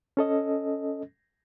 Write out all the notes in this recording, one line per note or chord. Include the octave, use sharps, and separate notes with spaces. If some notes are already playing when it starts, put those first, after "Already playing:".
C#4 A4 D#5